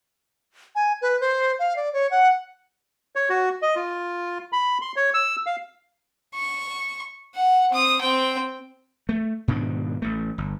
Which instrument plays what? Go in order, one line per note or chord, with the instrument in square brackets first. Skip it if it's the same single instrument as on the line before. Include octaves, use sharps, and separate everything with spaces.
[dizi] G#5
B4
C5
F5
D5
C#5
F#5
[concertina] C#5
F#4
D#5
F4
B5
C6
C#5
E6
F5
[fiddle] C#6
F#5
C4 D#6
C4 G5
[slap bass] A3
G#2 B2 D#3 D4
A1 A3
G1